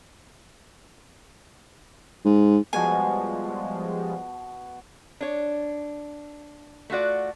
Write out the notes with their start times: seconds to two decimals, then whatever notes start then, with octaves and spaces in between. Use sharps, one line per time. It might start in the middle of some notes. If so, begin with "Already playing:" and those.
2.25 G#2
2.73 B2 F3 G3 G#3 F#4 G#5 A5
5.21 D4 C#5
6.90 A3 F4 F#4 D5